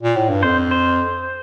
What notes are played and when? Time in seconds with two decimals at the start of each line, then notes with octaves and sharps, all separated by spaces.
0.03 A#2
0.16 A2
0.30 G2
0.43 F2 C5
0.71 C5